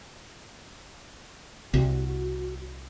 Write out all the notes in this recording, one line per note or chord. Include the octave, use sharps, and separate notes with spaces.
C2 F#4